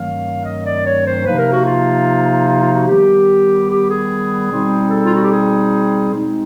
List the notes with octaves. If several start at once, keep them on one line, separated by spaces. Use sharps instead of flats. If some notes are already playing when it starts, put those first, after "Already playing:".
Already playing: G2 D#3 F#3 A3 C4 F5
D#5
D5
C#5
C5
C3 F3 A#3 D#4 B4
A#4
F#4
F4
F4
F4
F#4
D#3 G3 B3 G4
G4
G#4
B2 G3 C4 D#4
A4
F4
F#4
G4
G#4
B2 G#3 C4 D#4